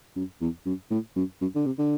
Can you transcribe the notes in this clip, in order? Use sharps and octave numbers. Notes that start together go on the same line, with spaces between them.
F#2
E2
F#2
A2
F#2
F#2
D3
C3
D3